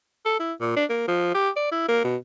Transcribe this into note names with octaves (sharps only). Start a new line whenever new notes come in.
A4
E4
A#2
D4
A#3
F3
G4
D5
E4
A#3
B2